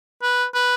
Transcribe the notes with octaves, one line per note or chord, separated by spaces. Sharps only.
B4
B4